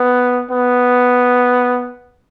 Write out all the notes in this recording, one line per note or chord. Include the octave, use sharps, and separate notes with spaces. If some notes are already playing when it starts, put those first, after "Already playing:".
Already playing: B3
B3